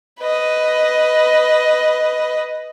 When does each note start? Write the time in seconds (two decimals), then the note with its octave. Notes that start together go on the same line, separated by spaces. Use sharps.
0.20 B4 D#5